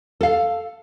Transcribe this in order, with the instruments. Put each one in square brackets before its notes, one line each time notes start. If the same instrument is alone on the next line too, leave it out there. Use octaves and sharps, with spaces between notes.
[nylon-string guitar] A4 F5